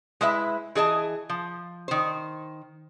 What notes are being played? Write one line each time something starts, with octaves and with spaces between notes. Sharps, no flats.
G#3 E4 B4 E5
E3 G#4 D#5 A5
F3
D#3 C5